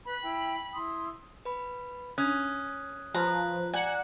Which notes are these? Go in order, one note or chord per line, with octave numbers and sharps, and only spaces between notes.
B4 B5
E4 G5
E4 C6 D#6
B4 B5
C#4 D#6 F#6 G#6
F3 B4 A#5
D5 F#5 G#5 A#5